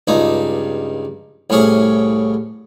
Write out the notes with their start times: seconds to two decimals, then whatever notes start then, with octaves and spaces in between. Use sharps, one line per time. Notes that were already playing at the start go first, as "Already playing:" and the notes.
0.08 C#2 G2 D#4
1.50 C2 A2 C#4 G#4